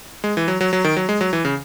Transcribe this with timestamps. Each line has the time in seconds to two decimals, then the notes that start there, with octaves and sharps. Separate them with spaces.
0.24 G#3
0.37 E3
0.48 F#3
0.61 F#3
0.73 F#3
0.84 D#3
0.96 F#3
1.09 G#3
1.21 F#3
1.33 E3
1.45 C#3